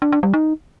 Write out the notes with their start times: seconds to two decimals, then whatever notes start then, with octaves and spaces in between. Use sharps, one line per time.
0.02 D4
0.12 D4
0.23 G3
0.34 D#4